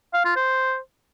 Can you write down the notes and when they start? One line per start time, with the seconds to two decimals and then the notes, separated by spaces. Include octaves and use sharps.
0.14 F5
0.25 F4
0.36 C5